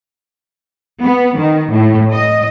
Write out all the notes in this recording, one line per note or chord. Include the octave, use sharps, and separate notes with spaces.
B3
D#3
A2
D#5